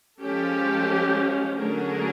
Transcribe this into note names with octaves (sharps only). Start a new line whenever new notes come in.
F3 G#3 C#4 G4 A4
D3 F#3 A3 C#4 G#4 A#4